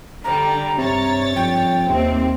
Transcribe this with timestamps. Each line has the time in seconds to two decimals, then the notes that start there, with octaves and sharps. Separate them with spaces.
0.24 D3 G3 A#5
0.78 G2 C3 C#5 A6
1.36 F2 G5
1.89 D#2 C3 C4